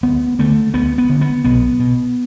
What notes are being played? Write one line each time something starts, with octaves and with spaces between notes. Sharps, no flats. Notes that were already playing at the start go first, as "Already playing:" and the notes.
D2 B3
D3 A3
D2 B3
B3
D3
B3
B1 B3
B2